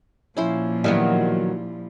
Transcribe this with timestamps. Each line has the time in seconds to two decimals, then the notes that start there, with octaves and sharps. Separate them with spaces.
0.37 A#2 F3 C#4 E4 C5
0.84 D#3 F#3 G3 B3 E4